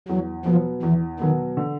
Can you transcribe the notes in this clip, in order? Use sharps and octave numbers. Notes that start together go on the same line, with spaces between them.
E2 F#3
B2 F3 F#3 B3
E2 E3
B2 D#3 F#3 B3
D3